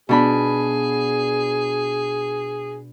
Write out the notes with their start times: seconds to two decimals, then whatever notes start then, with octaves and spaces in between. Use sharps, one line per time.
0.09 B2 D4 G#4 B5